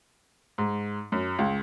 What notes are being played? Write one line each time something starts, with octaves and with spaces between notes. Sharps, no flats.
G#2
F#2
C#2